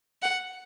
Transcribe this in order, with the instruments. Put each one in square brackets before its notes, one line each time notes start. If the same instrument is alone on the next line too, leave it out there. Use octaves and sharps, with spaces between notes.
[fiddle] F#5